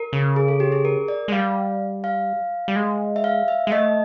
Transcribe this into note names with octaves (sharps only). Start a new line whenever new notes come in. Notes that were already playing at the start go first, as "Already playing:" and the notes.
Already playing: A#4
C#3
G#4
A4
G4
G#4
A#4
D5
G#3
G3 F5
F5
G3
G#3
E5
F5
E5
G#3
A3 D#5